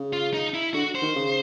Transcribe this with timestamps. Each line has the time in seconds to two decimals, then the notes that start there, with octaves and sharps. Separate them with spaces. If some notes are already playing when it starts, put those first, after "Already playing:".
Already playing: C#3
0.13 F4
0.34 D#4
0.54 E4
0.74 D3 F#4
0.95 C5
1.02 D#3
1.16 C#3